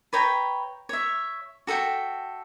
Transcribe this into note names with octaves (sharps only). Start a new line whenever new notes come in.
B4 C#5 G5 A#5
C#5 E5
F#4 A4 E5 G5